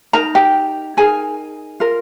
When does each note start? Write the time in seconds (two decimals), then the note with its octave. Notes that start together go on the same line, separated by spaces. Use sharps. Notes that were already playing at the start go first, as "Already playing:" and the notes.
0.13 D#4 A#4 A#5
0.35 G4 G5
0.97 D#4 G#4 A#4 G#5
1.80 F4 A#4